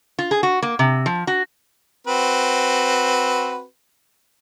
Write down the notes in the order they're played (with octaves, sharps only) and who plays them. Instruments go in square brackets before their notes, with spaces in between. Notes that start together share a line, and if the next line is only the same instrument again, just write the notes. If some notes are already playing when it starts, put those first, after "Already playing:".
[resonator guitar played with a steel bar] F4
G#4
F#4
A#3
C3
F3
F#4
[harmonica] C4 F#4 B4